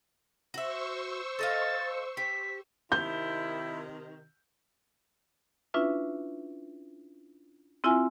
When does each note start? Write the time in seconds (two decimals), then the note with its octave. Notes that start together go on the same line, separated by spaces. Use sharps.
0.54 F#4 C5 E5 C#6 E6
1.39 A4 D#5 F5 A6
2.17 G4 B6
2.92 C3 D#3 E4 G6
5.74 C#4 D4 E4 F4 B4 E5
7.84 C4 E4 F4 E5 G#5